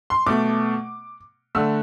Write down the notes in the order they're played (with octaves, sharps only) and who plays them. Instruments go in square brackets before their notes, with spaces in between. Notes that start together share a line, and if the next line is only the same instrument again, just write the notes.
[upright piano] C6
B2 A3 D6
D3 A3 E6